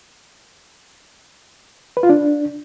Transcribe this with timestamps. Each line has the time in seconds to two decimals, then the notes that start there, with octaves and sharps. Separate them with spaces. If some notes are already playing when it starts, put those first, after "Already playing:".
1.97 B4
2.03 F4
2.10 D4